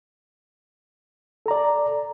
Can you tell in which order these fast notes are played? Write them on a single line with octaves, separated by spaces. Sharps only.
A4 A#5 D5